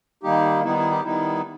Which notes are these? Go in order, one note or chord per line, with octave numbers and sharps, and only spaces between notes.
D#3 G3 A#3 D#4 G4
D#3 G3 B3 D#4 E4
E4
G4
D#3 G3 B3 D#4 E4